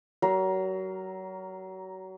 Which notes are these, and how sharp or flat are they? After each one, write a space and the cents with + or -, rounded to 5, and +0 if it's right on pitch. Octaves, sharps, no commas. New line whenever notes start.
F#3 +30 A#4 +0